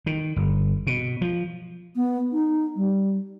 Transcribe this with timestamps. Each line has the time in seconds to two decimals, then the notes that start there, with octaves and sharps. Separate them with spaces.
0.06 D#3
0.36 G1
0.87 B2
1.21 F3
1.96 B3
2.32 D#4
2.76 G3